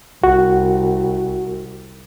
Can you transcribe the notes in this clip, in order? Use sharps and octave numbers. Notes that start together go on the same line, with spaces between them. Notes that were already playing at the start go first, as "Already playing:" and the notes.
C2 F#4